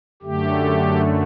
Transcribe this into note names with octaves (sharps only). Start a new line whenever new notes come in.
F#2 D3 A3 G4